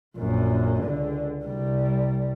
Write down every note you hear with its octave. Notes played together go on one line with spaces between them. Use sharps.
A#1 F#2
C#2 D3
C2 G3